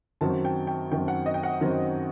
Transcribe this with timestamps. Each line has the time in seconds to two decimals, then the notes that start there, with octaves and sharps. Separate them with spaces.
0.21 F#2 D#3 F#3 C4 A5
0.45 G5
0.67 G5
0.91 F#2 D#3 F#3 C4 G5
1.08 F#5
1.26 D#5
1.34 G5
1.43 F#5
1.61 F#2 D#3 F#3 C4